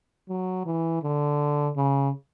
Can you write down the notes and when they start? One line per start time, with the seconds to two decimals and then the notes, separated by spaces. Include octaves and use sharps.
0.29 F#3
0.66 E3
1.02 D3
1.76 C#3